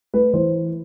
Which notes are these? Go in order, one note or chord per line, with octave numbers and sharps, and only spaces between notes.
A3 B4
E3 C5